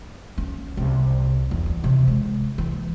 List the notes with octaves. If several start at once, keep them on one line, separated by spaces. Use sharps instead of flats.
C#4
C2
E2
E3
C3
G#3
E3